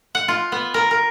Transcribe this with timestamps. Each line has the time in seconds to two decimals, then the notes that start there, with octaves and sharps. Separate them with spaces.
0.15 F#5
0.28 F4
0.52 B3
0.74 A#4
0.91 A#4